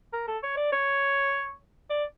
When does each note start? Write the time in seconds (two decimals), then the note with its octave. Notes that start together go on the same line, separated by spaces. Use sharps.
0.13 A#4
0.28 A4
0.43 C#5
0.57 D5
0.72 C#5
1.90 D5